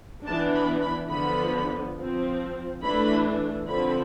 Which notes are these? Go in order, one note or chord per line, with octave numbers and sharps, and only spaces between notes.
E3 B3 D4 A5
B5
B5
D3 F3 B3 B5
F3 C4
E3 A3 D4 B5
D3 F3 C4 B5